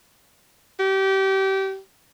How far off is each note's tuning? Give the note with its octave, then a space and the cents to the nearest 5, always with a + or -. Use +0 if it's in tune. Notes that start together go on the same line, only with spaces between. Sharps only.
G4 -25